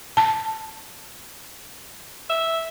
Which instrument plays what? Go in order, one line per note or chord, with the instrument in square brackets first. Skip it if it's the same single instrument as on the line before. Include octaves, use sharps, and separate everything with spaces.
[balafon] A5
[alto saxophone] E5